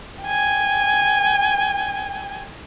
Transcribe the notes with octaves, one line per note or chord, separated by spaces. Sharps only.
G5 G#5